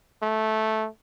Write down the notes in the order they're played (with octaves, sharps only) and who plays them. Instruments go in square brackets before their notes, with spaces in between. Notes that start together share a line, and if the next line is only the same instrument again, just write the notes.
[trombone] A3